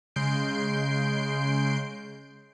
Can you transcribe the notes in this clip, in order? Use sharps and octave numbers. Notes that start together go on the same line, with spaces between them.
C#3 G#3 C6 G6 C7 D7